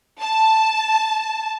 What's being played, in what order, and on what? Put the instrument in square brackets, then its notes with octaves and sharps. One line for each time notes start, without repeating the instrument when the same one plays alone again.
[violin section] A5